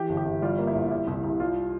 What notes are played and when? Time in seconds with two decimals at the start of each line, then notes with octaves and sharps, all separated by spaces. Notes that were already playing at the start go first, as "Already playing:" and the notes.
Already playing: E3 G4
0.09 G1
0.17 G4
0.25 G1
0.42 G3 F4
0.59 A#3
0.67 E4
0.75 A#1
0.91 G3 E4
1.07 C2
1.24 C2
1.40 G3 F4